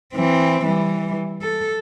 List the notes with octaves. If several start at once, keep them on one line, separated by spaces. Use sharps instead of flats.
E3 C4
E3 G3
A4